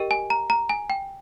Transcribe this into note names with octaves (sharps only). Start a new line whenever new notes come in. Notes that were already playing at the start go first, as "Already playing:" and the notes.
Already playing: G4 A#4 D#5 G5
G#5
A#5
A#5
G#5
G5